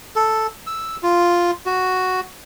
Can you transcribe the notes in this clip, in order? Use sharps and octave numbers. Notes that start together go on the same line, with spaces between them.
A4
E6
F4
F#4